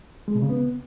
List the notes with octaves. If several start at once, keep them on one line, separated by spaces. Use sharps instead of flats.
G#3
B2
C#3
B3